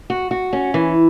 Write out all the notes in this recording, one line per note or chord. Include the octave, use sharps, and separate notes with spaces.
F#4
F#4
C#4
E3